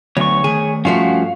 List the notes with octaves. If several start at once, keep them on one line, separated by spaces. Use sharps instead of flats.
D2 F#3 B3 C#5 C#6
D#3 A3 G#4
G2 F3 A3 C#4 F#4 F5